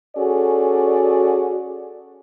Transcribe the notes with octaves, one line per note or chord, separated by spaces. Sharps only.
C#4 F#4 G#4 A4 D5